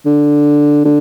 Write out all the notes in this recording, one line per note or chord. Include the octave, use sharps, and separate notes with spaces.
D3
D3